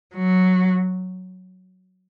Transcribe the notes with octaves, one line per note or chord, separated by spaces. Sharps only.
F#3